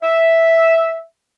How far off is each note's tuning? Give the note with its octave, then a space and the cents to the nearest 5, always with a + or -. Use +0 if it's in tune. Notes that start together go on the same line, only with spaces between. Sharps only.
E5 -5